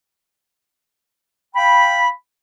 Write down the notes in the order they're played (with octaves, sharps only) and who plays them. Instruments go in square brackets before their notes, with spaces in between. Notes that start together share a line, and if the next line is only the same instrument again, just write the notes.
[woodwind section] F5 G5 B5